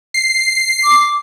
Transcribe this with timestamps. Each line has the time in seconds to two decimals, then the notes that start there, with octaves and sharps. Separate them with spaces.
0.14 C7
0.84 D6